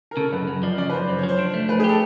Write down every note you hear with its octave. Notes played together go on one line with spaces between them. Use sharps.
A#4
C#3 A4
F#2 B4
F#2
F3 D5
C#3 D5
B4
F#2 C5
F#2 C5
C#5
F3
C5
D4
A3
A3 B4
G#4
G4 A4